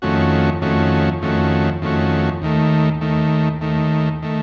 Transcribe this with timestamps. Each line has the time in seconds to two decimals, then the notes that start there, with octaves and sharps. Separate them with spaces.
0.02 F2 D#3 A3 C#4 F#4
0.61 F2 D#3 A3 C#4 F#4
1.22 F2 D#3 A3 C#4 F#4
1.82 F2 D#3 A3 C#4 F#4
2.42 D#2 D#3 A3
3.01 D#2 D#3 A3
3.61 D#2 D#3 A3
4.22 D#3 A3